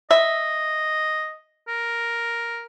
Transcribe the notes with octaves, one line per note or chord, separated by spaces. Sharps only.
D#5 E5
A#4